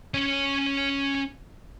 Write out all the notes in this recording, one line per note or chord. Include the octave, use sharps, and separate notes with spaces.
C#4 C#5